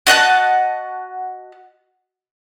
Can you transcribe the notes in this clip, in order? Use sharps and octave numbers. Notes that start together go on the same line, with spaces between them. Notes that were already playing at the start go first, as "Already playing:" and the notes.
F#4 D#5 F#5 A5